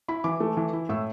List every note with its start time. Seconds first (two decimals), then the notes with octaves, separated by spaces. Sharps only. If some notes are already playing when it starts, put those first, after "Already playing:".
0.08 E4 B5
0.24 E3 D6
0.40 A3
0.57 E3
0.73 E4
0.89 A2 E6